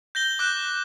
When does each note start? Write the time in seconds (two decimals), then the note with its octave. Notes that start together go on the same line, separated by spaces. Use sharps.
0.15 G6 A#6 G7
0.39 D6 F#6 G6